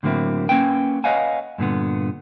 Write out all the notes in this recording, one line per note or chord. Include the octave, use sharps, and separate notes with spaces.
A2 D3 F#3 A#3 C4 E4
A#3 C#4 B4 G5
B4 C#5 D#5 F5 F#5 G#5
G2 A#2 D3 B3